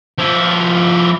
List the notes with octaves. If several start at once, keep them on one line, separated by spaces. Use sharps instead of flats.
F3 E4